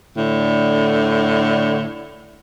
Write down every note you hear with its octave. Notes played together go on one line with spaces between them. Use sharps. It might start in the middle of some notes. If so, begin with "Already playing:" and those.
A2 D3